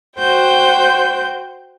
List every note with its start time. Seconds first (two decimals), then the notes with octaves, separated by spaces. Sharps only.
0.18 F#4 C5 G5 G6